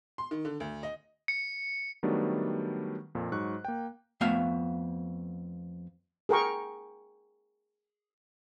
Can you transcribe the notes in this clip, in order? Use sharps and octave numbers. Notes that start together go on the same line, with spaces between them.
C6
D#3
D3
D2
D#5
C#7
D#3 F#3 G3 A3 B3 D4
F2 A#2
G#2 F#3 C#6 F#6
A#3 G5
F2 A3 B3 E5 F5
G#4 A#4 G5 C#6